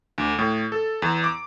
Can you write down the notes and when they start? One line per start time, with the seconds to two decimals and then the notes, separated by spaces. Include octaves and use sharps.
0.18 D2
0.39 A2
0.72 A4
1.02 E2
1.24 D6